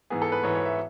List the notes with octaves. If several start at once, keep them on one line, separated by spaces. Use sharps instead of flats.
G#2 E3 B3 G#4
A4
B4
G#2 E3 B3 C#5
C#5
E5